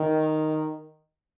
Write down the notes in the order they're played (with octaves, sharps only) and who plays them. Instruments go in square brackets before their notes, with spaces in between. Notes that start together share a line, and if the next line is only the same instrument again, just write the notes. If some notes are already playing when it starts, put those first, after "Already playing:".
Already playing: [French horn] D#3